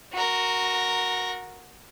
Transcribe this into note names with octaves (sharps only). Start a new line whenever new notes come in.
F#4 A#4